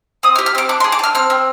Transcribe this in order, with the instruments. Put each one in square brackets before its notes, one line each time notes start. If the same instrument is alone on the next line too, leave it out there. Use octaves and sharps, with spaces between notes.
[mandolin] C4 D#6
F6
G4
F6
C4 D6
D4 D6
C6
G#4
D6
D4 F6
C4 F6
C4